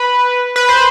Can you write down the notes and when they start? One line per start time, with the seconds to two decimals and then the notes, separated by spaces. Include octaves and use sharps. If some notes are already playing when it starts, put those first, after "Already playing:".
Already playing: B4
0.56 B4
0.69 C5